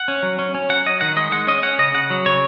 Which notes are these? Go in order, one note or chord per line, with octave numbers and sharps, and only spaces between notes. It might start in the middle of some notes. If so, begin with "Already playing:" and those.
Already playing: F#5
C#4
F#3
C#4
C#4
F#3 F#5
F#3 D#5
D#3 F#5
G#3 D#5
G#3 F#5
C#4 D#5
C#4 F#5
C#3 D#5
C#3 F#5
F#3
C#3 C#5